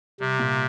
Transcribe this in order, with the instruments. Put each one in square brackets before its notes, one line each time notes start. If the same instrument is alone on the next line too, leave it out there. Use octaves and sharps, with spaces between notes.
[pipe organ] C3 [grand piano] G3
[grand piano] A#2